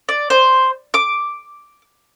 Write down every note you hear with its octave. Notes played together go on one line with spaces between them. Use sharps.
D5
C5
D6